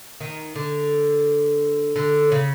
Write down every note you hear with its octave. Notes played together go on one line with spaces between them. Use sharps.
D#3
D3
D3
C#3